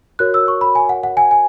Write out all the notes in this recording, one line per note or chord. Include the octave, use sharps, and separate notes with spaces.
F#4 A#4 C#5 F#6
E6
C#6
B5
G#5
F#5
F#5
G#5
G#5